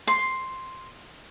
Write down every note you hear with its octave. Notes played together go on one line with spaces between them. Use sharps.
C6